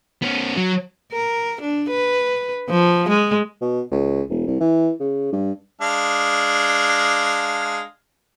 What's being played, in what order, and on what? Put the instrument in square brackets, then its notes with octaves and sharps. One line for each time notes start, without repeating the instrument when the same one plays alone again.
[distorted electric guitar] B3 C#4
F#3
[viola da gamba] A#4
D4
B4
F3
G#3
[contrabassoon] B2
C#2
E1
C2
E3
C#3
G2
[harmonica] G#3 D4 F5